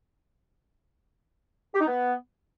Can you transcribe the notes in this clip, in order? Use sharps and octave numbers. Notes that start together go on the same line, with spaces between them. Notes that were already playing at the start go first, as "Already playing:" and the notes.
G4
D#4
B3